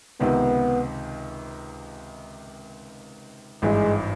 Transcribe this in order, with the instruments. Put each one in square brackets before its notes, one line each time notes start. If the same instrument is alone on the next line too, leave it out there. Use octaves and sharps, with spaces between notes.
[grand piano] C#2 C3 D#3 [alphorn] B3
[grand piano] G#1 G2 E3 [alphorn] G#3